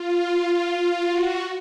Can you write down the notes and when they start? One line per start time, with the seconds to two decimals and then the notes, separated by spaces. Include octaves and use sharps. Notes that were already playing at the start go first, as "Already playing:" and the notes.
Already playing: F4
1.09 F#4